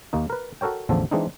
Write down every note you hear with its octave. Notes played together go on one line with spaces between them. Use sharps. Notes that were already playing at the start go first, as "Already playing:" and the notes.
D#2 A#3 D#4
A#4 B4
F#4 A4 A#4 C#5 G5
A1 E2 D3 F3 A4 A5
E3 G#3 C4 D4 D#4